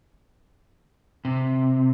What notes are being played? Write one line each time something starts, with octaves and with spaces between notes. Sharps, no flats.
C3